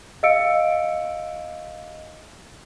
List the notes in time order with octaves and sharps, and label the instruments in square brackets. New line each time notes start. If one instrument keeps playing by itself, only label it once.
[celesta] D#5 F5 E6 C#7 D7